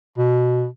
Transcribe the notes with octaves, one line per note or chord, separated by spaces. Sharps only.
B2